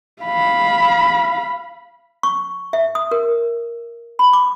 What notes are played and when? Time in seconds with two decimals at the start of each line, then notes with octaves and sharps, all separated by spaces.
0.23 F5 B5
2.23 C#6
2.73 E5
2.95 D#6
3.11 A#4
4.19 B5
4.33 D6